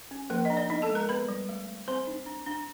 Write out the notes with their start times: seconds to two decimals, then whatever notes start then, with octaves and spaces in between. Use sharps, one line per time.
0.11 C#4
0.30 F3 A#3 A#4
0.45 D4 D#5
0.57 D4 D5
0.70 B3 D#4 D#5
0.82 A4 A5
0.89 G#3
0.95 A#4 A#5
1.08 B3 B4 B5
1.28 G3
1.49 A3
1.68 A3
1.88 C4 C5 C6
2.07 D#4
2.26 D4
2.47 D4